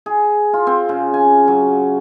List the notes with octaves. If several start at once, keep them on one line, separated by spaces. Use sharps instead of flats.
G#4
F4
C4
C#3
G#5
F#3